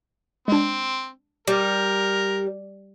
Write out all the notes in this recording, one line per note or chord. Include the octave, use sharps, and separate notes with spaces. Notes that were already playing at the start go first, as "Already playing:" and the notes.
G#3 C4 D4
G3 A#4